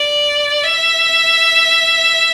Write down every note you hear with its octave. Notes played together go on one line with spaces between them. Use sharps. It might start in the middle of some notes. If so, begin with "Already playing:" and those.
Already playing: D5
E5